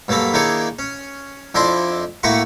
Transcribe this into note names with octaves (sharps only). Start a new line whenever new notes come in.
G2 F#3 A#3 A4 B5
D#3 A#3 D4 E4 G#4 C#5
C#4
F2 D4 E4 D5 D#5 C6
A2 A3 A#3 F#4 B5 C#6